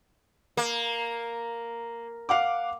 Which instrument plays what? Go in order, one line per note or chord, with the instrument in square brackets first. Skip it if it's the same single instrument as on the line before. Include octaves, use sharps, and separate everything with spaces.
[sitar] A#3
[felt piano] F5 F#5 D6